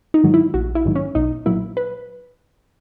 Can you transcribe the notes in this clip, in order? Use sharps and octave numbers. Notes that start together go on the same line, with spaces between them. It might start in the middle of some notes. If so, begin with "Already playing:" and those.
D#4
G#2 D#3 F#3
E4
A#1 F#4
E4
G#2 D#3 F#3
C#4
B1 D#4
A#2 F#3 A#3 E4
B4